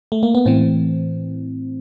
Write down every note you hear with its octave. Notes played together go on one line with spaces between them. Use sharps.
A3
A#3
B3
A2 E3 C4